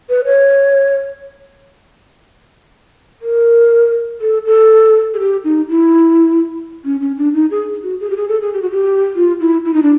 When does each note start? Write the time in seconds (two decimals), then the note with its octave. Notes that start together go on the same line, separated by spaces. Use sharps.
0.09 B4
0.25 C#5
3.22 A#4
4.21 A4
4.46 A4
5.14 G#4
5.20 G4
5.44 D#4
5.69 E4
6.85 C#4
7.01 C#4
7.18 D4
7.34 D#4
7.51 G#4
7.83 F#4
8.00 G#4
8.10 G4
8.17 G#4
8.29 A4
8.41 G#4
8.53 G4
8.62 F#4
8.71 G4
9.16 F4
9.40 E4
9.65 E4
9.74 D#4
9.82 D4